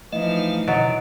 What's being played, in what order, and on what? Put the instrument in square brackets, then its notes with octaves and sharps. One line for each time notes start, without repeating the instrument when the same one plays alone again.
[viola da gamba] E3 F3 D#4 [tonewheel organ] A3 F5 [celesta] D#5
[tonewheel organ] B2 D3 [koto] F#3 [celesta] D#5